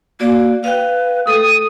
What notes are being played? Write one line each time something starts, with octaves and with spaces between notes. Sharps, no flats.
A#3 F#4 D5
B4 F5 G5
A3 A4 D#6